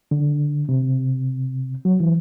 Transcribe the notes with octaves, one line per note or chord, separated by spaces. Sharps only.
D3
C3
F#3
E3